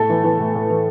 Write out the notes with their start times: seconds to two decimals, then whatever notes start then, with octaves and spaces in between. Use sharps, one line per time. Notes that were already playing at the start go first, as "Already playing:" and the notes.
Already playing: A2 A3 A4
0.09 E3
0.24 E3
0.39 A2
0.55 A2
0.70 E3